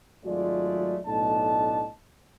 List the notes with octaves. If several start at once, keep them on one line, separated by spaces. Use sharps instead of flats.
G#1 F#3 G#3 A3 F4 D5
B1 A2 A3 D4 D#5 A5